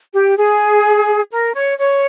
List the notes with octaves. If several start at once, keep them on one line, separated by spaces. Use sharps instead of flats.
G4
G#4
A#4
C#5
C#5